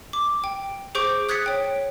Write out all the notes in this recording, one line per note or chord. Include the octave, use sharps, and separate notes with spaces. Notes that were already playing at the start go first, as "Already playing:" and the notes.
D6
G5
G#4 C5 C#6 D6 G6 D7
D#6 F#6 G#6 A6 B6 C#7
C#5 G5